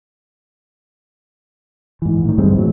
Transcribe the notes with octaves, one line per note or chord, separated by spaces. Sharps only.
G#2 E3
A2 D#3
G2 G3 G#3 C4
A2 E3 F#3